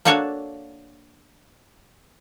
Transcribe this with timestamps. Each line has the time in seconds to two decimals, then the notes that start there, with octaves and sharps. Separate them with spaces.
0.05 A#3 D4 F#4 A4 C#5 F5